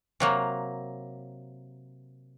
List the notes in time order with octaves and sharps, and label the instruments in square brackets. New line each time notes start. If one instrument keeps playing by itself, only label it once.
[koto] C3 F#3 A#3